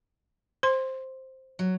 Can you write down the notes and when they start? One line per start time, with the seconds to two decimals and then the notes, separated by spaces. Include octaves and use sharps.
0.63 C5 C6
1.59 F#3